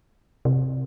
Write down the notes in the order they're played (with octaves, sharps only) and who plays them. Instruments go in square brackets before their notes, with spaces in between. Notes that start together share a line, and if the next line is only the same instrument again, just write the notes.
[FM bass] C3